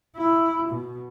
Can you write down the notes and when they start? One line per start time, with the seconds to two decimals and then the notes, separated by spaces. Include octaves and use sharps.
0.16 E4
0.69 B2